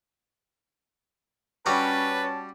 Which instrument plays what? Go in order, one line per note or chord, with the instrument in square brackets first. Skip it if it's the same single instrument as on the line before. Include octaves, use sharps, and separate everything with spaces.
[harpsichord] G3 F#4 G4 [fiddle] C#4 C#5 [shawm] B4 [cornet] A5